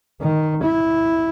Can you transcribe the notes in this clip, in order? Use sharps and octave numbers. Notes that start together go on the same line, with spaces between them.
D#3
E4